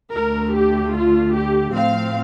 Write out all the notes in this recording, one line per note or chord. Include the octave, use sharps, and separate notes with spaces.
D2 D3 A3 A#4
G4
F4
G4
A2 F3 A3 C4 F5